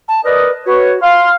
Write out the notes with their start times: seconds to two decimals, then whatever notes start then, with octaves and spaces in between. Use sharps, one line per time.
0.08 A5
0.25 A#4 B4 D5 D#5
0.66 F#4 B4 C#5
1.02 F5 C6